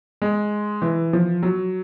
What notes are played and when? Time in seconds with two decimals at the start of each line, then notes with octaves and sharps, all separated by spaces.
0.22 G#3
0.82 E3
1.13 F3
1.43 F#3